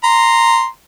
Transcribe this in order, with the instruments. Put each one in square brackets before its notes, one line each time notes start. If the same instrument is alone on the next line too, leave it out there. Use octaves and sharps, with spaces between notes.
[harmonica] A#5 C6